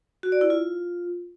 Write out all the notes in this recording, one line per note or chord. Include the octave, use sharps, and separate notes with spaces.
F#4
D5
E4
F4